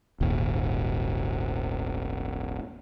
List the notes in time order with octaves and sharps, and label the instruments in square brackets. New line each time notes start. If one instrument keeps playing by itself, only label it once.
[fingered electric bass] D#1 G#1 D#2